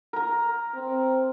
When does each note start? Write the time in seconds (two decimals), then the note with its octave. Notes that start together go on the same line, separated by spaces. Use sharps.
0.13 A#4 A#5
0.75 C4